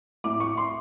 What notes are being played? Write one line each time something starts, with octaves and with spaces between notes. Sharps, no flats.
A2 D6
C#6
C6